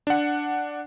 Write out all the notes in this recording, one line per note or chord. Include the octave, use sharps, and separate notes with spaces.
D4 F#5